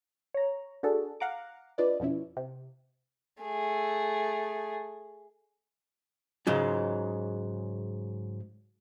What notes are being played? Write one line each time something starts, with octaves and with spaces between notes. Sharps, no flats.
C#5 A#5
D4 F#4 G#4 A4
F5 F#5 A#5 D6
D4 F4 B4 D5 D#5
F2 B2 F3 C#4 E4
C3
A3 G#4
G#2 C#3 F#3 F4